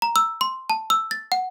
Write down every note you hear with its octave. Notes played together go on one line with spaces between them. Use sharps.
A#5
E6
C6
A5
E6
A6
F#5